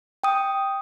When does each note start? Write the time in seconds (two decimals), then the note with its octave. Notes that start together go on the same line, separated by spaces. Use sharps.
0.24 G5 D#6